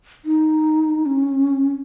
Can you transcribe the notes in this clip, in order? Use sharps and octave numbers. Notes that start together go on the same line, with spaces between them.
D#4
C#4